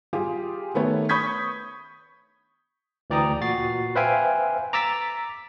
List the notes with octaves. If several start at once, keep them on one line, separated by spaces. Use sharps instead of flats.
G3 F4 G4 G#4
D#3 A3 B3 C#5
B5 C#6 D#6 G6 G#6 B6
D2 E3 D5 G5 A#5 D#6
A#2 F#4 A6 C7
B4 C5 E5 F5 G5 G#5
A#5 D6 E6 A6 B6